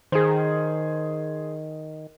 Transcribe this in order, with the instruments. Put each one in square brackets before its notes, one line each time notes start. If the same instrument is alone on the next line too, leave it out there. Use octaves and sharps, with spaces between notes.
[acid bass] D#3 [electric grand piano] G#4 C5